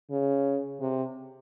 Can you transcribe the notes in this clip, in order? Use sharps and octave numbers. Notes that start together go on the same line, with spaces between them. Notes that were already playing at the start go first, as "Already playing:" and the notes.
C#3
C3